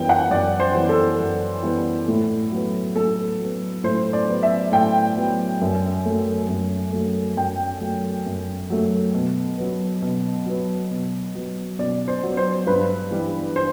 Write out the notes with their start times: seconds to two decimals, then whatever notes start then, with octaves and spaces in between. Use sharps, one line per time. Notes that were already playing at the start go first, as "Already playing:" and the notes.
Already playing: F#2 E3 G3 B3 G5
0.09 F#5
0.31 F#2 D5
0.60 C5
0.74 E3 G3 B3
0.89 A4
1.20 F#2
1.63 E3 G3 B3
2.08 A2
2.52 F#3 B3
2.96 A2 A4
3.40 F#3 B3
3.84 A2 C5
4.13 D5
4.29 F#3 B3
4.43 E5
4.72 A2 G5
5.17 F#3 B3
5.61 F#2
6.05 F#3 A3
6.49 F#2
6.92 F#3 A3
7.37 F#2 G5
7.81 F#3 A3
8.26 F#2
8.70 F#3 A3
9.14 B2
9.58 F#3 B3
10.02 B2
10.46 F#3 B3
10.91 B2
11.35 F#3 B3
11.79 B2 D5
12.08 C5
12.23 F#3 B3
12.37 C5
12.66 G2 B4
13.11 E3 G3
13.56 C5